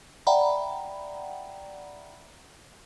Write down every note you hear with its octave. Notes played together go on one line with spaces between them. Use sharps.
D5 E5 F#5 G5 A#5 B5